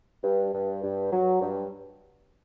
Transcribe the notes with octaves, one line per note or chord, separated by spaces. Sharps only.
G2
G2
G2
F#3
G2